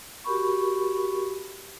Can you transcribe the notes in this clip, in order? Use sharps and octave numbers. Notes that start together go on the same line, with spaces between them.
F#4 G4 A#4 B5 C#6